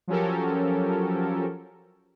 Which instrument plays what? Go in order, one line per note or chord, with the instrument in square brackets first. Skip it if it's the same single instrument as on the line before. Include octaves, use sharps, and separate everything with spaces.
[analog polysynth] F3 F#3 C#4 G4 A4 A#4